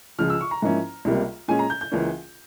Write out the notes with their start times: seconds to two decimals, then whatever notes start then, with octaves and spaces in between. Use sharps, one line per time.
0.19 C#2 C#3 F3 F6
0.30 E6
0.41 C#6
0.51 A#5
0.62 G#2 F3 A#3 C#4 E4
1.05 C#2 C3 G3 A#3
1.48 A#2 G#3 C#4 G#5
1.59 A#5
1.70 G6
1.81 G6
1.92 C#2 C#3 E3 A#3 C#4